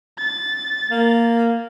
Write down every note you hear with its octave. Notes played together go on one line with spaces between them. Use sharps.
A6
A#3